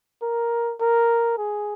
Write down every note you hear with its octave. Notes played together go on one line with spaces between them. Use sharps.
A#4
A#4
G#4